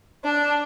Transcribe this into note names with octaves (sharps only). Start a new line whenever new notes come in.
D4